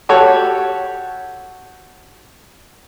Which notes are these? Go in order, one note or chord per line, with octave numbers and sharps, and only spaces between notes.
F#4 G4 A4 C#5